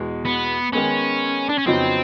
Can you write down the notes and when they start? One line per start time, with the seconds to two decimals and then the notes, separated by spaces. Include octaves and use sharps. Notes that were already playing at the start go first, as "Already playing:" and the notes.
Already playing: E2 B2 G#3
0.26 B3
0.73 D#3 G#3 B3 C#4
1.49 D4
1.58 C#4
1.67 F2 C#3 F#3 B3 C4 D#4